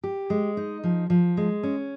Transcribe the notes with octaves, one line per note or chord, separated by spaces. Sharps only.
G4
G#3
D#4
F3
F3
G#3
C#4